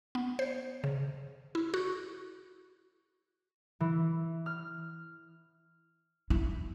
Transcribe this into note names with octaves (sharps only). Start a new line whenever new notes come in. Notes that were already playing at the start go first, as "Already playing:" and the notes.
B3
C5
C#3
E4
F#4
E3
F6
E4